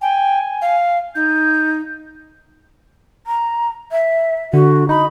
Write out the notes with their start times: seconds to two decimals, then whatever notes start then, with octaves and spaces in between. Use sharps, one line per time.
0.01 G5 G#5
0.61 F5
1.15 D#4 G6
3.27 A#5
3.92 E5
4.53 D3 F#4
4.89 D#4 B5